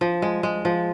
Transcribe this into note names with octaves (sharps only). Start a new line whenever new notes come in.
F3
G#3
G#3
F3